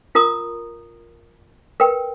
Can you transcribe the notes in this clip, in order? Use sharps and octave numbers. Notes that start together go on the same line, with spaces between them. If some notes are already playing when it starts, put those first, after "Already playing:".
F4 A#4 A#5 D#6
A#4 B4 G5